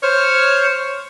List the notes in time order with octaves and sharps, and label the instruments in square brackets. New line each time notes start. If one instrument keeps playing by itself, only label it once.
[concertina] C5 F6 [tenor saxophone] C#5